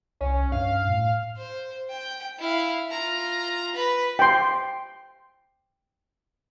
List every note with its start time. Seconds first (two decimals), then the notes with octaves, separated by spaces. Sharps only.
0.21 C2 C#4
0.52 G2 F5
0.87 A2
1.37 C5
1.90 G5
2.39 E4 F5
2.89 F4 A#5
3.75 B4 B5
4.19 G5 C6